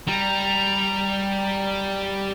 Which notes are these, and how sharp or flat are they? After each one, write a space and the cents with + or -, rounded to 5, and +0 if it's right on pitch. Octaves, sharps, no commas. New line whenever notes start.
G3 +0 A#5 +0